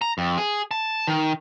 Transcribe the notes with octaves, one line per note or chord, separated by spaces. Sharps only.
A#5
F2
G#4
A5
D#3